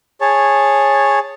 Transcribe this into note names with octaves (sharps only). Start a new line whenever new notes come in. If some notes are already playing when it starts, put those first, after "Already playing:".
G#4 C#5 A5